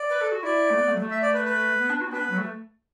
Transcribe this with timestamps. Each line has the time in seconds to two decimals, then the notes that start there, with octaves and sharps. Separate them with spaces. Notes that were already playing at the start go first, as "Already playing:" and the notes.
Already playing: D5
0.10 B4
0.21 A4
0.32 F#4
0.43 E4 D5
0.70 A3
0.77 B3
0.88 A3
0.95 F#3
1.00 A3
1.11 E5
1.23 D5
1.34 B4
1.45 B4
1.79 B3
1.90 D4
2.01 F#4
2.07 B3
2.13 D4 B4
2.21 B3
2.30 F#3
2.38 A3